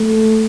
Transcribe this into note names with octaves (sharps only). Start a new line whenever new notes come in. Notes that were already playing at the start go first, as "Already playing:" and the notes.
Already playing: A3